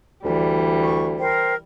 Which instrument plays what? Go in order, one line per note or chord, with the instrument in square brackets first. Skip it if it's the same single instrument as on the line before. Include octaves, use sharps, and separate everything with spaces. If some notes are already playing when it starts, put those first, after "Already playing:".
[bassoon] D2 [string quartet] E3 G3
[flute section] C#6
A#4 C5 G5